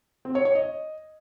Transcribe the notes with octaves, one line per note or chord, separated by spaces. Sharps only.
C4
C#5
C#5
D#5